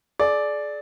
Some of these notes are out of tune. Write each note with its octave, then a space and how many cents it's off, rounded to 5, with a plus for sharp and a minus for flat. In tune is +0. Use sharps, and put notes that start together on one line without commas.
G#4 +40 D5 +0